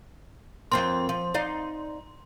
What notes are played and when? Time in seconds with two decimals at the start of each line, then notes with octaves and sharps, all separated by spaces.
0.72 F2 C4 A#4 C6
1.09 F3
1.34 D#4 D5 F5